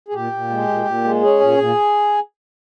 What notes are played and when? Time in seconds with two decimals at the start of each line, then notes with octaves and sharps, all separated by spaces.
0.08 G#4
0.14 A#2 G4
0.32 A#2
0.50 G#3
0.68 A#2
0.86 A#2
1.04 G#3
1.22 C#4 G#4
1.40 A#2
1.58 A#2